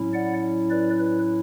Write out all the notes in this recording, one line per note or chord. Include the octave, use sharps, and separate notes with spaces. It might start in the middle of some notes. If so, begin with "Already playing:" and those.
Already playing: A2 F#3 C#4 E4
D5 F#5
B4 D5
B4